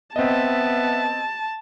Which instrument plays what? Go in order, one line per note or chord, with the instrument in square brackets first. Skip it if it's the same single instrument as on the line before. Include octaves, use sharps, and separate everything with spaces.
[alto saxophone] B3 [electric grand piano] C4 D#5 [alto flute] E5 [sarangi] A5